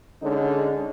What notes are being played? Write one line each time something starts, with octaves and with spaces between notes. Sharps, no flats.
D3 G#3 C#4 D#4